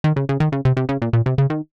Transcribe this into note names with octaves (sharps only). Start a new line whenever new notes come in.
D#3
C#3
C#3
D#3
C#3
C3
C3
C#3
A#2
A#2
C3
C#3
D#3